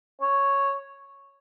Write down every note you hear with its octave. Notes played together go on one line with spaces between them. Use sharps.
C#5